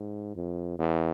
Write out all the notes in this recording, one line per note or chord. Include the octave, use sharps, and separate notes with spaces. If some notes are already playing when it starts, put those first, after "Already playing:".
Already playing: G#2
F2
E2